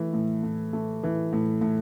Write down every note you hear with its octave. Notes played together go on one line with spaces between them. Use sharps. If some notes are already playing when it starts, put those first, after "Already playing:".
Already playing: E3 A3
A2
A2
A3
E3
A2
A2